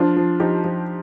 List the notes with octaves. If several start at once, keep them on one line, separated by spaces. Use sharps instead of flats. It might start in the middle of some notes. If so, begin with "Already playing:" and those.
Already playing: F3 D4 F4
F3
F3 D#4 G4
F3